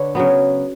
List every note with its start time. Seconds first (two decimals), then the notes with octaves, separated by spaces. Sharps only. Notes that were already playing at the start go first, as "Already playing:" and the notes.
Already playing: D3 B4 C#5
0.15 C#3 F#3 B3